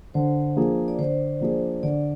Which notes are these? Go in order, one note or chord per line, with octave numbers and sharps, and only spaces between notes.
D3 C5
F3 A#3 D4 G#4
D5
D3 C5
F3 A#3 D4 G#4
D3 D5